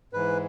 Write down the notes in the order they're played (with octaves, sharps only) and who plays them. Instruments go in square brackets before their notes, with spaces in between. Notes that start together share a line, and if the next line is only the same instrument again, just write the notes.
[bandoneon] G#2 E3 B4